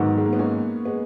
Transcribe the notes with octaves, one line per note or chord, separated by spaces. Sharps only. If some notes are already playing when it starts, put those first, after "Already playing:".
Already playing: G#2 D#3 F#3 B3 D#4
G#3
A#3
B3
A#3 C#4
G#3 B3